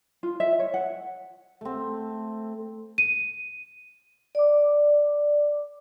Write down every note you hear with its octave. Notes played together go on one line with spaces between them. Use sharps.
F4
E5
C#5
F#5
A3 C4
D#7
D5 D6